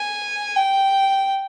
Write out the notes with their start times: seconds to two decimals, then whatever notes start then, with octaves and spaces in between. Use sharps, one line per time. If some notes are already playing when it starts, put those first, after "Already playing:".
Already playing: G#5
0.56 G5